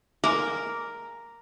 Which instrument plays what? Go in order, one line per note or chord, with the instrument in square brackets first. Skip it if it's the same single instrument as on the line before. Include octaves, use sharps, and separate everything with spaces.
[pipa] G#3 A#3 [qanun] A#4